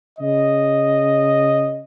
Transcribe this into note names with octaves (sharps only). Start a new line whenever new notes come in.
C#3 D#5